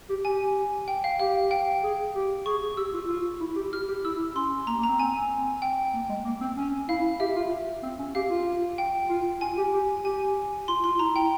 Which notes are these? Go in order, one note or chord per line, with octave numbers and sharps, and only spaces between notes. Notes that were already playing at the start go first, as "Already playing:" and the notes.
G4
G4 G#5
G5
F5
G4 F5
G5
G#4
G4
G#4 C#6
G4 E6
F4
F4
E4
G4
G4 F6
G4
E4 E6
C#4 C6
A#3 A#5
A#3
A#5
C4
C4 G#5
C4
G5
A#3
G#3
A#3
C4
C#4
E4 F5
G4 E5
F4
C4
C#4
G4 F5
F4
G5
F4
F4 G#5
G4
G4
G4 G#5
F4 C6
F4 C6
E4 A#5
G5